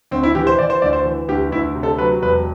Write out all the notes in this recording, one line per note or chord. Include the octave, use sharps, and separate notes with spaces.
D2 C4
E4
E3 G4
C5
E3 D5
C5
D2 D5
C5
E3
D2 G4
D2 E4
C3
A4
F#3 B4
E1 B4